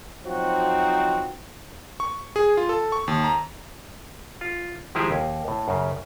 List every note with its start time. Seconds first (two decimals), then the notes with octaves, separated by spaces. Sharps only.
0.24 F3 F#3 C4 D#4 F#4
2.00 C#6
2.36 G#4
2.57 F4
2.69 A4
2.92 C#6
3.08 D#2
3.24 A#5
4.41 F4
4.95 D#3 F3 G#3 E4 G4 G#4
5.11 D#2
5.48 A2
5.68 F#2 C#3